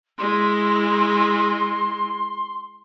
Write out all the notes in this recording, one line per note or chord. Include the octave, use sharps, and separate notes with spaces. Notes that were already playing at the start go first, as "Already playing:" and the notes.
G#3 E4 C6